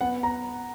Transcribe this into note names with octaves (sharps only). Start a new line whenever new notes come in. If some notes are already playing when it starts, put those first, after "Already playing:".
B3 F#5
A#5